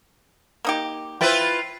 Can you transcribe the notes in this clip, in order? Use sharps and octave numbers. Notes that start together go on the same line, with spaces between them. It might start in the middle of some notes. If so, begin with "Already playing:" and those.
A#3 D#4 G4
E4 F4 B4 C5 G5